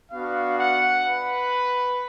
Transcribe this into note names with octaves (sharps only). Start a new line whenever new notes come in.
B3 D4 F#4 F5
F#5
B4